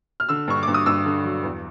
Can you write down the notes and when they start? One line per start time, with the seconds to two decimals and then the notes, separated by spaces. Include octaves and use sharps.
0.20 F6
0.29 D3 E6
0.48 G2 C#6
0.63 D6
0.68 G2
0.74 D#6
0.86 G2 E6
1.05 D3
1.24 F#3
1.44 E2